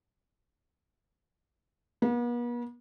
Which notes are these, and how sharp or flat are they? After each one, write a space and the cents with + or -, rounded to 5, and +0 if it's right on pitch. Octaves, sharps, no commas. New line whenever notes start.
B3 -45